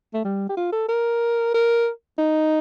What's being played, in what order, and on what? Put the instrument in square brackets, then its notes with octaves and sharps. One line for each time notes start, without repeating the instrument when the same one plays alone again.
[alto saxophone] A3
G3
G4
F4
A4
A#4
A#4
D#4